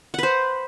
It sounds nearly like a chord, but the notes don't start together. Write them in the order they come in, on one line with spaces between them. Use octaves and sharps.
F#5 B4 C5